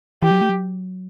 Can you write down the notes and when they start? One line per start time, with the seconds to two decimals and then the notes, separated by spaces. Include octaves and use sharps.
0.22 E3 G4
0.31 F#3
0.41 A3
0.49 F#3